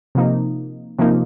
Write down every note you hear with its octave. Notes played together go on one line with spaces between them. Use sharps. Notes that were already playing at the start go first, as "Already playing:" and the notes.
C3 F3 A#3 D#4
C3 F3 A#3 D#4